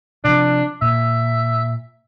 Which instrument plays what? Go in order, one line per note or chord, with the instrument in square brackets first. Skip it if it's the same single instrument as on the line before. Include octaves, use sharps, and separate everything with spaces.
[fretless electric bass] C3 D#3 F3 [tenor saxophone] D4
[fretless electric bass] A#2 [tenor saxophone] E5